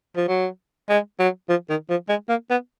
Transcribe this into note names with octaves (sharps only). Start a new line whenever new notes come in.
F3
F#3
G#3
F#3
F3
D#3
F3
G#3
A#3
B3